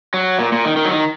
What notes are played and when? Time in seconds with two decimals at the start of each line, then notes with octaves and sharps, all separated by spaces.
0.14 F#3
0.39 A#2
0.52 A#2
0.65 D#3
0.77 D#3
0.85 F#3
0.91 D#3